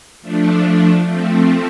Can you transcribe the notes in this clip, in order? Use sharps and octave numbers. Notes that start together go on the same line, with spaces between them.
F3 A3 D4
F3 A3 C4